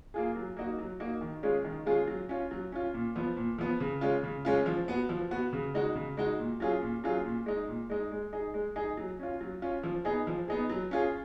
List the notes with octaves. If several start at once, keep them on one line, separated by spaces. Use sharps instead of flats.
A#3 F4 G#4
F#3
A#3 D#4 F#4
F#3
A#3 D#4 F#4
D#3
G#3 C#4 F4 G#4
D#3
G#3 C#4 F4 G#4
F#3
C#4 F4
F#3
C#4 F4
A#2
F3 B3
A#2
F3 B3
C#3
G#3 C#4 F4
C#3
G#3 C#4 F4
F3
B3 F#4
F3
B3 F#4
C#3
G#3 D#4 F#4
C#3
G#3 D#4 F#4
A#2
F#3 C#4 F4 G#4
A#2
F#3 C#4 F4 G#4
A#2
G#3 D#4
A#2
G#3 D#4
G#3
D#4 G#4
G#3
D#4 G#4
F#3
C#4 F4
F#3
C#4 F4
F3
B3 D#4 G#4
F3
B3 D#4 G#4
F#3
C#4 F4 G#4